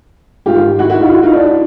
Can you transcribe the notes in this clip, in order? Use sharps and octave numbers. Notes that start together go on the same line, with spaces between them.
G#2 D#3 F4 G4
E4 F#4
E4 F#4
D#4 F4
E4 F#4
D#4 F4
D4 E4